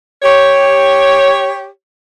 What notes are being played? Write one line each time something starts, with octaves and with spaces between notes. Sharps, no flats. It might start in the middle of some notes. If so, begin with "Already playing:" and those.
G4 C#5